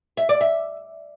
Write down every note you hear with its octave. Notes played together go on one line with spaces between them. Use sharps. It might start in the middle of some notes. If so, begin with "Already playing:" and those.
E5
D5
E5